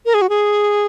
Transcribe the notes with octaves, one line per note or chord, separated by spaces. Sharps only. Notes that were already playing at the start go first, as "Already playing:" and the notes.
A#4
G#4
F#4
G#4